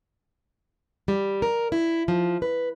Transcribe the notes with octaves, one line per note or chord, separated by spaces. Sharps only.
G3
A#4
E4
F3
B4